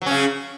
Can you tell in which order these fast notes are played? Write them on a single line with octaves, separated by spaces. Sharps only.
F#3 C#4 C#3